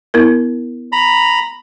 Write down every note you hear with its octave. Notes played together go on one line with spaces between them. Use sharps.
B3 E4 A#4
A#5 B5